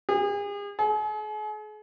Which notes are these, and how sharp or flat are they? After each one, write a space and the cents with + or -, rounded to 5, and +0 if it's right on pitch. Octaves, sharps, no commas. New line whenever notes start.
G#4 -40
G#4 +40